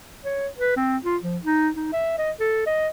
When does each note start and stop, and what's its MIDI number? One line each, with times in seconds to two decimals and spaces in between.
0.25 0.47 73
0.58 0.75 71
0.76 0.97 60
1.05 1.17 65
1.22 1.37 53
1.43 1.69 63
1.75 1.91 63
1.92 2.13 76
2.18 2.31 75
2.40 2.64 69
2.66 2.88 75